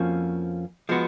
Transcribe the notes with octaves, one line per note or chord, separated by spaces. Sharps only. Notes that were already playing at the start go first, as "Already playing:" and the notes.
Already playing: F2 F3 A#3 C#4 F#4
F3 G#3 B3 F#4